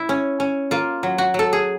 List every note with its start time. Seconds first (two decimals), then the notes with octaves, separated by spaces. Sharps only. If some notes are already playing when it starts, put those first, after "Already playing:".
Already playing: E4
0.09 C#4
0.40 C#4
0.71 A#3 F4
1.03 F#3
1.18 F#4
1.34 F#3 A4
1.53 G#4